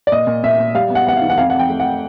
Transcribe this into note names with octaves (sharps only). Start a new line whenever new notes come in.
D5
A#2 D#5
A#2
A#2 E5
A#2
G3 F5
B3
F#5
B3 F#5
F5
D#3
F#5
F2 F5
F#5
F2
G5
A3
F#5